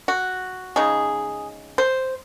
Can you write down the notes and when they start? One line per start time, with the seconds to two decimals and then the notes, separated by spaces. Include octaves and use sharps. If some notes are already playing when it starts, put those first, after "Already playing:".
0.08 F#4
0.76 C#3 G#3 D#4 G#4
1.78 C5